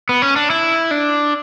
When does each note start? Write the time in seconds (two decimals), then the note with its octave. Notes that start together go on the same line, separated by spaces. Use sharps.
0.09 B3
0.22 C#4
0.36 D4
0.50 E4
0.91 D4